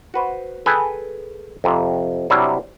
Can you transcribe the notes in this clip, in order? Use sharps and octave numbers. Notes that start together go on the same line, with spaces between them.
F#4 B4 C5
G#4 A4 B4 G5 G#5
F2 C3
C3 F#3 G3 C4 D4 E4